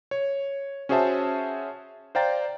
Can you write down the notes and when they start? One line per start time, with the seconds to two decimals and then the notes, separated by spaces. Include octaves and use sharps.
0.11 C#5
0.89 C#4 F#4 G#4 C5 E5 A5
2.15 C5 D5 F5 G5 A#5 A6